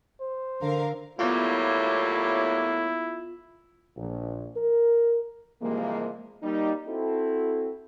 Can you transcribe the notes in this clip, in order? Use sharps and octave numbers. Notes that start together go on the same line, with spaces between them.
C5
D3 A#4 F5
A2 F#3 G3 A#3 B3 E4 F4
A#1
A#4
C3 E3 F3 G3 G#3 A#3
G3 A#3 D#4
C4 E4 F#4 A4